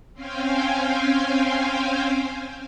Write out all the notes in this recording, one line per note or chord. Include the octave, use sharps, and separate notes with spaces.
C4 C#4 C5 F5 G5 G#5